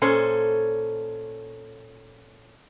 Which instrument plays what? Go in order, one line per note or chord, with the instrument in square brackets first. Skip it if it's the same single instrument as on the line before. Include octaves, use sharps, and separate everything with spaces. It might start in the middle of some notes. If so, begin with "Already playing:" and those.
[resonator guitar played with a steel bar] A#2 C#4 A4 C5